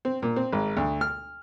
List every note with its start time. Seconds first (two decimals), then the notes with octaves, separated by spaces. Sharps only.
0.05 C4
0.22 A#2
0.36 C4
0.52 G#1
0.77 D2
1.01 F6